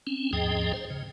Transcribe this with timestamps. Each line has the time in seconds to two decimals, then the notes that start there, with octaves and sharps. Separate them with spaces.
0.07 C4 C#4
0.33 D#2 G#2 F3 G#4 D#5 G5
0.73 C5
0.90 C#3